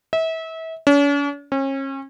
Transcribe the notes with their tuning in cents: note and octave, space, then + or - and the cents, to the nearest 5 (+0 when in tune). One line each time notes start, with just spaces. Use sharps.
E5 -30
C#4 +45
C#4 -35